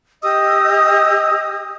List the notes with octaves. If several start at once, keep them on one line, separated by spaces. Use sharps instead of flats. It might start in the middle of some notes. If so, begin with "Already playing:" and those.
G4 D#5 D#6 E6